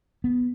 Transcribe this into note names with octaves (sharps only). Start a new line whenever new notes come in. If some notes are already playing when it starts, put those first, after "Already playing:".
B3